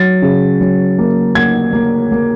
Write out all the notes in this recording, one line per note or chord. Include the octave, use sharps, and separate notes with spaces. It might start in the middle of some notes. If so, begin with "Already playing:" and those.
Already playing: F#3 A6
C#3
F#3
A#3
A#3 G#6
A#3
A#3